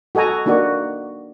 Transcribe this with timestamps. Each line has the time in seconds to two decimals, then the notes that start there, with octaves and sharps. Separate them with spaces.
0.15 F#4 A4 D#5 G#5 A#5
0.46 A#3 D4 D#4 F#4 D5